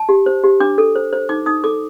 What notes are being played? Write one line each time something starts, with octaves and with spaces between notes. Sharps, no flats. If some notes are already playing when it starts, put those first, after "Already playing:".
Already playing: A5
G4
C5
G4
D4 D6
A4
C5
C5
D#4 D6
D#4 D#6
A4 D6